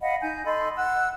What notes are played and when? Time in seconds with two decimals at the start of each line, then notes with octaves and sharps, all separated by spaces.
0.01 D#5 F5 F#5 B5
0.22 D#4 G#5 G6
0.45 A4 D#5 B5 C6
0.77 F#5 E6 F#6